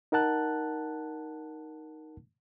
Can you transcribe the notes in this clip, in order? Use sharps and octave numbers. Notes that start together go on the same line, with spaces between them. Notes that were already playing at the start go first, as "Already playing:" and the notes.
D#4 A#4 F#5 A5 F#6